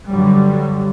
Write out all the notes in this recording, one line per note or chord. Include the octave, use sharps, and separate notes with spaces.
G2 D3 F#3 G3